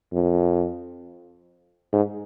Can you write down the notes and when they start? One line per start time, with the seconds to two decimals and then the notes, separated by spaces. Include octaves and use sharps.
0.13 F2
1.93 G#2